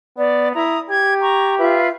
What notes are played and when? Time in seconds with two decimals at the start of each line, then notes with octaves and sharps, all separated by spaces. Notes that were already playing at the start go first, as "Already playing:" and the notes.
0.18 B3 D5
0.55 E4 A#5 D#6
0.90 G4 G#6
1.21 A#5 C#6
1.59 F4 B4 E5